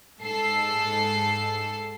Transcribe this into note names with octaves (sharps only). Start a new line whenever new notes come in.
G#2 A4 C7